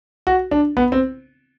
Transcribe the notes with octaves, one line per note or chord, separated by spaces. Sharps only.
F#4
D4
B3
C4